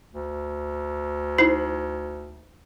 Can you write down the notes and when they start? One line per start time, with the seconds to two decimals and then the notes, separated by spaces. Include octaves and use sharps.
0.12 D2
1.38 D#4 E4 C5